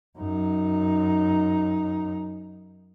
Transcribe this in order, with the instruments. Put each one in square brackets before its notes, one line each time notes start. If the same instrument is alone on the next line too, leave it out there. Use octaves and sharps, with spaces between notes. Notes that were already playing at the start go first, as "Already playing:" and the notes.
[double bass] F#2 D#4